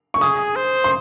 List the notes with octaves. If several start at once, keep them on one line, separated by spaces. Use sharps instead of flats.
C#6
G#4 D#6
C5
C6